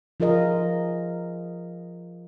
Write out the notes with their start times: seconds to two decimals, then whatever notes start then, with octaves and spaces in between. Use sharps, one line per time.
0.20 F3 F4 G#4 A#4 D#5